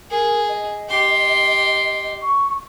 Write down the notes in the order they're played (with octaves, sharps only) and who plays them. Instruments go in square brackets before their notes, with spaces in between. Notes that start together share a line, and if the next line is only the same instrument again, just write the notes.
[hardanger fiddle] G#4 [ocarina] A#4
[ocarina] D#5
[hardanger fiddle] G4 C6
[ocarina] C#6